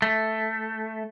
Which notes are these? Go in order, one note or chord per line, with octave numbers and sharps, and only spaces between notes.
A3